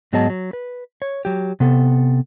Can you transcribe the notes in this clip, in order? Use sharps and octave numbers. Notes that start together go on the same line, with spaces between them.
G#2 F#3 B3 G#4 D#5 A5
F#3
B4
C#5
F#3 G4
C3 B3 A4